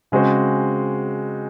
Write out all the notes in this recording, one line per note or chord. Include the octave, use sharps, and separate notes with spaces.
C#3 G#3 C4 F#4 C5